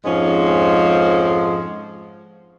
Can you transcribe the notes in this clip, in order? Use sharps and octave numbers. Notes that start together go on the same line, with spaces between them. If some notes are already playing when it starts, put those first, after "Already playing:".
F2 G#2 F3 G#3 C#4